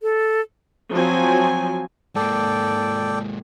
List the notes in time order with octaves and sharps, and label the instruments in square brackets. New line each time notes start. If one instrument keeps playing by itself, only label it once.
[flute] A4
[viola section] F3 F#3 C4 G#5
[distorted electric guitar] G#2 A#3 [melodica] A4 D5 G5